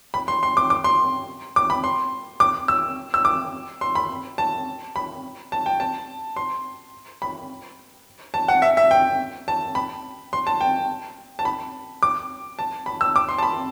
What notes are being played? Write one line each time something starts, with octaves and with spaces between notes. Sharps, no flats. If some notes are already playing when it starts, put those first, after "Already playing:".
B5
C6
C6
D6
D6
C6
D6
B5
C6
D6
E6
E6
D6
C6
B5
A5
B5
A5
G5
A5
C6
B5
A5
F#5
E5
E5
G5
A5
B5
C6
A5
G5
A5
B5
D6
A5
B5
E6
D6
C6
A5
B5